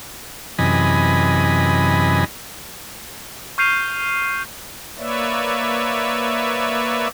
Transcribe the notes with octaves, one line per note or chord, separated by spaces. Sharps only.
F#2 C3 E3 D#5 G#5 B5
C#6 F6 G6 C7 D#7 F7
A#3 B4 C#5 D5 E5